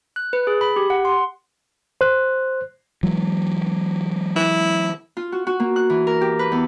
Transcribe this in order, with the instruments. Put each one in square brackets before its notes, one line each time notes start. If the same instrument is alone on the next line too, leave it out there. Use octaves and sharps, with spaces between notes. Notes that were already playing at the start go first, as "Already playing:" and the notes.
[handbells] F#6
B4
G#4
B5
G4
F#5
C6
[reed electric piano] C5 F#6
[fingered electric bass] E3 F#3 G#3
[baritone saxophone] E4
[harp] F4
F#4
F#4
A#3
F#6
E3
A#4
G4
B4
E2